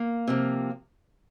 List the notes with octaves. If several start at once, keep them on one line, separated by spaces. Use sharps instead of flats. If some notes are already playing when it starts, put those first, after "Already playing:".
Already playing: A#3
C3 F3 A#3